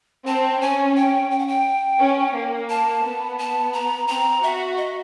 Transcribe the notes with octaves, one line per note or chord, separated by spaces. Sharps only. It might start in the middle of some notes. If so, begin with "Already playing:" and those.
C4 A5
C#4 G#5
G5
G5
F#5
G5
C#4
A#3
A5
B3
A5
A#5
C4 A#5
F#4 E5
D#5